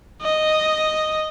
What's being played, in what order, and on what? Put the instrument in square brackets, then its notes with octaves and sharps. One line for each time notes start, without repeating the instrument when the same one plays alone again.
[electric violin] D#5